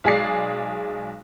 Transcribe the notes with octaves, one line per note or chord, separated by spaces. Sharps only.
B1 G#3 G#4 D5 C7